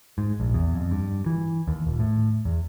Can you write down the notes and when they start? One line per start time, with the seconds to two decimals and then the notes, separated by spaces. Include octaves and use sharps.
0.18 G#2
0.40 A#1
0.54 E2
0.75 F2
0.91 G2
1.26 E3
1.68 D#2
1.87 D#1
1.99 A2
2.45 E2